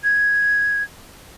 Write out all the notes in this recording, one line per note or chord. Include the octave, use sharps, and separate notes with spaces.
G#6